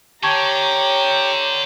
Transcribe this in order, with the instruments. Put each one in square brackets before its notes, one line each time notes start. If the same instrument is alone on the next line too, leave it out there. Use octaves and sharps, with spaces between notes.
[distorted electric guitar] D3 [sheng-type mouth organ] G4 [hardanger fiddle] C#5 A#5 [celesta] A5 C#6 G#6